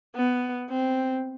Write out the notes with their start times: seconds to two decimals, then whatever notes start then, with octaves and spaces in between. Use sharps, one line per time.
0.15 B3
0.70 C4